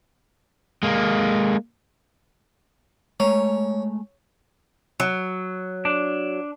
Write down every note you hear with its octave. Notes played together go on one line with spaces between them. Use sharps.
G#3 A#3
G#3 A3 C#5 A#5
F#3
D4